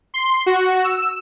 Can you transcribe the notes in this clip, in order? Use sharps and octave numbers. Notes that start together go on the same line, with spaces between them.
C6
F#4
E6